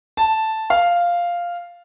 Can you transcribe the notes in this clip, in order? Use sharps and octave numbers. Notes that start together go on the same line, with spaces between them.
A5
F5